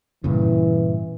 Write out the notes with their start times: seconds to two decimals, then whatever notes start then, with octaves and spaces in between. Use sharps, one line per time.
0.24 G2 A#2 C#3 E3